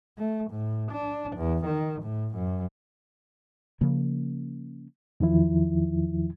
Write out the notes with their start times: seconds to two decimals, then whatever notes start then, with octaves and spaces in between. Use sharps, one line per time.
0.18 A3
0.51 A2
0.92 D4
1.37 E2
1.66 D#3
2.02 A2
2.35 F#2
3.81 C#3 F3 A#3
5.20 E2 D#3 F3 E4